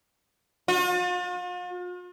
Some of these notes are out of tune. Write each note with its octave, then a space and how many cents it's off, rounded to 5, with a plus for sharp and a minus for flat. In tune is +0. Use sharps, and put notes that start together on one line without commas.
F4 +45